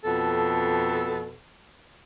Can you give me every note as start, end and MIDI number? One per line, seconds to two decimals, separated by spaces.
0.04 1.33 41
0.04 1.33 47
0.04 1.33 69